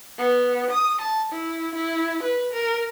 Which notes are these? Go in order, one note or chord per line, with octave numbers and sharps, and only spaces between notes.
B3
D#6
A5
E4
E4
B4
A#4